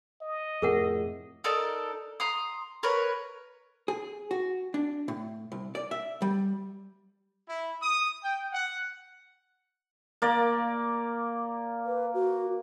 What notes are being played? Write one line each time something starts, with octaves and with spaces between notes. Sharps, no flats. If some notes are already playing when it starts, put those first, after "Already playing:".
D#5
F2 A2 C3 G#4 A#4 F#5
D#4 A4 A#4 D5
A#5 C6 D#6
A#4 B4 C#5
G#4
F#4
D4
A2
C2
D5
E5
G3
E4
D#6
G5
F#5
A#3 D5
B4
F#4